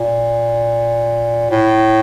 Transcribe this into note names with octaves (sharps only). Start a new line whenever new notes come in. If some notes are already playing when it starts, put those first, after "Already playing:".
Already playing: A#2
A2